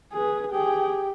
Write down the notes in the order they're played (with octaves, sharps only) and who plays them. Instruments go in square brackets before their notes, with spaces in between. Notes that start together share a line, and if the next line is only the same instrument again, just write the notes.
[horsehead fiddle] G#4 B4
[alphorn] G4 [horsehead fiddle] G#4 G5